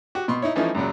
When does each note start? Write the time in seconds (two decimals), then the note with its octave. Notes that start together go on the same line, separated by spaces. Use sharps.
0.15 F#4 G4
0.28 B2 C6 C#6
0.42 D#4 E4 C#5
0.56 E3 F3 A3 C#4 D#4 E4
0.75 F#2 A#2 C#3 F#3